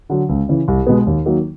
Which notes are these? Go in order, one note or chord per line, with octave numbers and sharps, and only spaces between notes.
D3 F#3
C#2
C#3 E3
C2
B2 G#3 B3
D#2
D#3 F#3 A#3